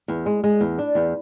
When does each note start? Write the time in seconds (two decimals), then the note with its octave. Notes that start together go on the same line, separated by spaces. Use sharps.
0.08 E2
0.26 G#3
0.44 G#3
0.61 E2
0.78 D4
0.95 E2